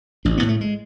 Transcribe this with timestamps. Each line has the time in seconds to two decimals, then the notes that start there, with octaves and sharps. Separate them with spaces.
0.25 A1 D4
0.38 B3
0.43 A2
0.49 A3
0.61 G#3